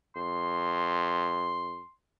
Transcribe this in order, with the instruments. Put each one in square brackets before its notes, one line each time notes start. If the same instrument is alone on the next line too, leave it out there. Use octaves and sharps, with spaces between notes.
[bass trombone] F2 [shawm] C6